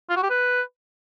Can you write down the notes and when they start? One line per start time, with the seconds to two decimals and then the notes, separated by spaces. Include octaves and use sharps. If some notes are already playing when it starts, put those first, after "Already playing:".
0.10 F4
0.17 F#4
0.23 G4
0.30 B4